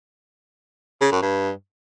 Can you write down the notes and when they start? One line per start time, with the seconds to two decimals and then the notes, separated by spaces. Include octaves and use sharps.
1.01 C#3
1.12 F#2
1.22 G2